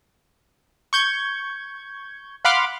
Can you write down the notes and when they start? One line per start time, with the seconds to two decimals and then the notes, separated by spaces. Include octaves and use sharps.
0.93 C#6 G6 G#6
2.45 F5 F#5 B5 C6 D6 F6